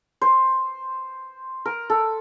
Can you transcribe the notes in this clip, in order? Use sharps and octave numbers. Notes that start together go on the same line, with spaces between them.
C5
A#4
A4